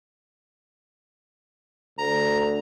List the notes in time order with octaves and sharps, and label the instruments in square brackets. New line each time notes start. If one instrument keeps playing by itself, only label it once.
[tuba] D2 [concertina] A#5